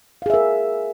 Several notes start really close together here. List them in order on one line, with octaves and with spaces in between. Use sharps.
F5 G#4 E5 A#4